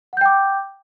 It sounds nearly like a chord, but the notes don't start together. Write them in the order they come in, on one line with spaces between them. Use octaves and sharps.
F#5 G6 G5 D6